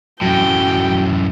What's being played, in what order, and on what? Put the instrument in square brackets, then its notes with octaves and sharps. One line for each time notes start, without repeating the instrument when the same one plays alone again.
[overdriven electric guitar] F#2 A2 [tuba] F#3 [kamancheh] G5